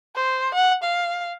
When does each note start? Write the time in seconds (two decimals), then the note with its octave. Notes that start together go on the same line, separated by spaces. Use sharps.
0.16 C5
0.55 F#5
0.83 F5